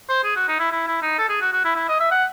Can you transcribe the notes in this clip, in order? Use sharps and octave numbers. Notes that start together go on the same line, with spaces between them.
C5
G#4
F#4
D#4
E4
E4
E4
D#4
A4
G#4
F#4
F#4
E4
E4
D#5
E5
F#5